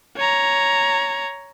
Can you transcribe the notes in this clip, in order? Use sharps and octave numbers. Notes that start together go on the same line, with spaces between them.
C#5 A#5